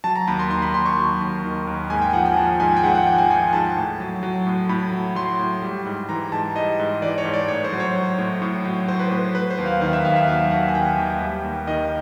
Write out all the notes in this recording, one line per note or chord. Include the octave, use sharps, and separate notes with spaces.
F#3 A5
A#5
D#2 B5
C6
D#3 C6
B5
D#2 C6
C#6
F#3
D#2
D#3
D#2
G#2 G#5
G5
F3 F#5
G#5
F3 A5
G#2 G#5
G5
G#2 F#5
F#5
F3 G5
G#5
F3 G#5
G#2 A5
A2
F#3
F#3
A2
A2 B5
F#3
F#3 C6
A2
G3
G#2
E3 A#5
G#2 A5
G3 D#5
G#2
E3 D5
C#5
G#2
D5
A2 C#5
C5
F#3
C#5
F#3
A2
A2
F#3
F#3 C5
B4
A2 B4
F#3 B4
C5
D#2
F5
D#3 F5
E5
D#2 F5
E5
F#3 F5
D#2 F#5
G#5
D#3 G5
D#2
G3
D#2
D#3 D#5